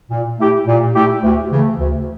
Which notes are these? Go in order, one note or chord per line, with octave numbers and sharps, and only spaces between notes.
A#2
A3 E4 G4
A#2
A3 E4 G4
D2
C#3 E3 A3
D2